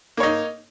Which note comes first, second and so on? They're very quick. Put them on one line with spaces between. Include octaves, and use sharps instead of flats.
A#3 C#5 D#4